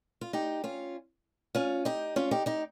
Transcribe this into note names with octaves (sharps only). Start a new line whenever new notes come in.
F4
D#4 G4
C#4 F4
C#4 F4
D#4 G4
C#4 F4
D#4 G4
D#4 G4